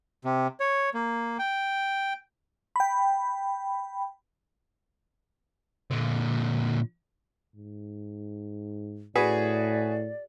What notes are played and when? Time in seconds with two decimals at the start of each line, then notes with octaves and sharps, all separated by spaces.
0.25 C3
0.60 C#5
0.94 A#3
1.39 G5
2.76 G5 B5
5.91 A#2 D3
7.55 G#2
9.15 A2 F#4 G#4 B4 D5